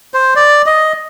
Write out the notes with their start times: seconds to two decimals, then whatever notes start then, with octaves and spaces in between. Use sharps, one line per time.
0.14 C5
0.36 D5
0.66 D#5